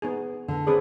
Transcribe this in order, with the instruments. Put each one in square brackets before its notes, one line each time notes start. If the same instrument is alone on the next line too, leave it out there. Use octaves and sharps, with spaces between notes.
[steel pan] B3 D#4 G#4
[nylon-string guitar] D3
[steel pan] C4 B4 D5 [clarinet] G#4